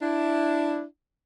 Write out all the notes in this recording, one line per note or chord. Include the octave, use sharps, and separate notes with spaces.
D4 E4